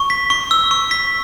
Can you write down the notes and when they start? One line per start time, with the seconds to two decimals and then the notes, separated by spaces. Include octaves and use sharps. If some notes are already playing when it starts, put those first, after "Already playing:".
Already playing: C#6
0.10 B6
0.30 C#6
0.51 E6
0.71 C#6
0.91 B6